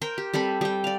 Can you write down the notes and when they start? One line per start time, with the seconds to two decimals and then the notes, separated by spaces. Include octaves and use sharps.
0.02 A#4 C5 G5
0.18 G4
0.34 G3 C4 A4 B5
0.61 G3 G5
0.84 D5 F5